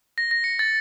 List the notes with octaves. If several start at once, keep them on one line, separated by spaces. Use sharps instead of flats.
A#6
A#6
C#7
A6